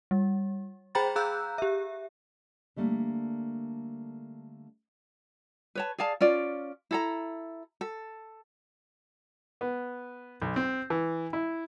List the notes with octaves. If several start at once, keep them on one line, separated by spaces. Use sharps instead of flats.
G3
G#4 C5 G5 A#5 B5 A6
G#4 F5 A#5 E6 F#6 G6
G4 E5
D3 G3 A3 A#3
B4 C#5 A5
G#4 D5 F5 A5
C#4 F4 D5
E4 A4 A#5
A4
B3
B1
C4
E3
E4